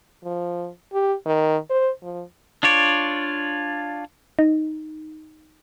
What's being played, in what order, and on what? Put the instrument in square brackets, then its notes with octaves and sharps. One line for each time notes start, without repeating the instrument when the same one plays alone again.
[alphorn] F3
G4
D#3
C5
F3
[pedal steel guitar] D4 F4 C#5 D5
[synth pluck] D#4